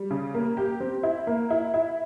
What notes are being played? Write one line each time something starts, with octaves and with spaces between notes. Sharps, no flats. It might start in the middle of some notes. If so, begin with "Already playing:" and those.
Already playing: G3
C#3
A#3
G4
C4
E4
A#3
E4
E4